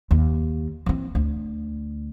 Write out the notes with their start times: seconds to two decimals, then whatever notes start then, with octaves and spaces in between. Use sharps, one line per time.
0.11 D#2
0.86 E3 C4
1.15 D2